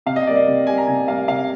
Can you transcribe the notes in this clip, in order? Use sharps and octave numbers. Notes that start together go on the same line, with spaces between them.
C3 F5
D#5
G3 A#3 D5
D#5
C3
G3 A#3 G#5
A#5
C3 G#5
G3 A#3 F5
C3 F5